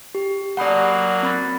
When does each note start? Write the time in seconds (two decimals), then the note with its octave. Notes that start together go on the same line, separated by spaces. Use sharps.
0.15 G4
0.57 F#3 A3 A#3 D5 F#5 B5 D#6
1.23 C4 B5 A6